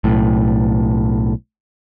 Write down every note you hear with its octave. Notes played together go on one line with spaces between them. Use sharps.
B1 A2